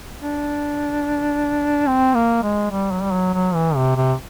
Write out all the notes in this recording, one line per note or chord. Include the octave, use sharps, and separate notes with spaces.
D4
C4
A#3
G#3
G3
F#3
G3
F#3
F#3
E3
C3
C3